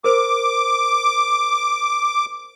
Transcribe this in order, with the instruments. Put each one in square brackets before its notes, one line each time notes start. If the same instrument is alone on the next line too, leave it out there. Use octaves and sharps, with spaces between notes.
[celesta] A#4 C5 [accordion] D6